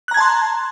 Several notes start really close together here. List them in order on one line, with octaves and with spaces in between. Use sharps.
F#6 A#5 G#6 A5 C6